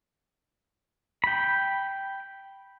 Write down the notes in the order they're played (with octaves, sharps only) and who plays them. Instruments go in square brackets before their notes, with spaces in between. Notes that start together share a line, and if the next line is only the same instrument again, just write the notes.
[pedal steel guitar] G5 B5